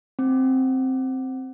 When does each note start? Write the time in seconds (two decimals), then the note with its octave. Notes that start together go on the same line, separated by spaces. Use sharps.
0.19 C4